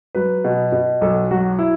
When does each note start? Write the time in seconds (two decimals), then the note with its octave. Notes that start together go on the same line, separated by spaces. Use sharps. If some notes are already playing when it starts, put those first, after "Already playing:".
0.15 F#3 B4
0.44 B2
0.72 B2
1.01 B1 A4
1.31 F#3 F#4
1.59 E4